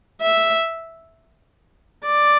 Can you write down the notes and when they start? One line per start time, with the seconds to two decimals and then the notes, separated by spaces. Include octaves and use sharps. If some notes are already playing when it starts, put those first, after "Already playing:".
0.21 E5
2.06 D5